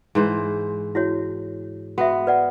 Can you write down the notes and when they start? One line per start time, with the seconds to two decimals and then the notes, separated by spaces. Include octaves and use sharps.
0.15 G#2 E3 C5
0.95 E4 F#4 C#5
1.98 B3 F#4 E5
2.27 B4 D5 F#5